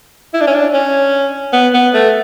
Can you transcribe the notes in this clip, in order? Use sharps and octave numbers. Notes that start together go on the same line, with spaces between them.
E4
D4
C#4
D4
C#4
B3
B3
A3